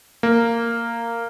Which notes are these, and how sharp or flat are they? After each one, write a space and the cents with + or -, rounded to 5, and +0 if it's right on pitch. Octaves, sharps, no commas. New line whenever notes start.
A#3 -10